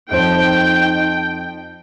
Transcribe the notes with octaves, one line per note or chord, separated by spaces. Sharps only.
F2 F3 D#4 C5 G5